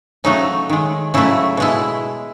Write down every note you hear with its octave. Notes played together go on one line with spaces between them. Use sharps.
C#3 F#3 A3 D#4
D#3 G#3
C#3 F#3 A3 E4
B2 G#3 E4